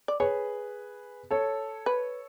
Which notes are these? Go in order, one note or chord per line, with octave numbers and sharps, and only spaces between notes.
D5
G#4 B4 C#5
A4 C#5
B4